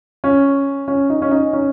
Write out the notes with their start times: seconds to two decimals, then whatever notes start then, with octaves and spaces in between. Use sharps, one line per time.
0.24 C#4
0.88 C#4
1.10 D#4
1.22 C#4
1.31 D#4
1.53 C#4